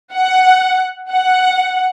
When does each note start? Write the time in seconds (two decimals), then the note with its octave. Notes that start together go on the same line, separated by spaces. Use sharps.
0.13 F#5
1.11 F#5